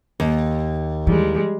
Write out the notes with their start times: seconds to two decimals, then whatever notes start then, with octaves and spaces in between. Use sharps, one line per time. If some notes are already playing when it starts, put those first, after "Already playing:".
0.20 D#2
1.07 E3 G3 G#3